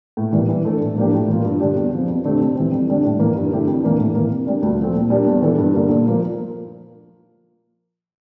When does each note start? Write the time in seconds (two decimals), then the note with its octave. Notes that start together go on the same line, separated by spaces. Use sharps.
0.17 A2
0.33 E3 G3 A#3 E4
0.49 E3
0.65 A3 D4 A4
0.80 A2
0.96 F3 A#3 D4 G4
1.13 A2
1.28 E3 G3 A#3 F4
1.45 G2
1.60 D3 G3 D4 G4
1.76 E2
1.92 C3 F3
2.08 F2
2.24 D3 A3 C4 G4
2.40 C3
2.55 E3 G3 C4
2.72 F2
2.87 D3 G3 D4
3.03 A2
3.19 E3 A#3
3.35 G2
3.51 D3 A3 E4 G4
3.67 F2
3.83 E3 A#3 D4
3.99 A2
4.15 E3 A#3
4.31 C3
4.46 G3 D4
4.62 D2
4.79 C3 F3 A3 C4
4.94 A#2
5.10 G3 D4 G4 A#4
5.27 E2
5.42 E3 G3 D4 A4
5.58 G2
5.74 D3 G3 A#3
5.90 A#2
6.06 F3 A#3 F4